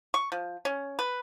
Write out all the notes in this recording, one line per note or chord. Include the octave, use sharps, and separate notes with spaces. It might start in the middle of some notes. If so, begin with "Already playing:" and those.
C#6
F3
C#4
B4